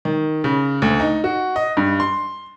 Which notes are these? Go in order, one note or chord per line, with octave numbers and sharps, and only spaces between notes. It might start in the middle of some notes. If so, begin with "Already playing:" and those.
D#3
C#3
D2
D#4
F#4
D#5
G2
C6